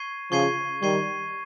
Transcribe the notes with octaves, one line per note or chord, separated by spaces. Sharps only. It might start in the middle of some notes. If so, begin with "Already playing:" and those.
Already playing: C#6 G#6 C7 D#7
C#3 F3 C#6 G#6 C7 D#7
D#3 G3 C#6 G#6 C7 D#7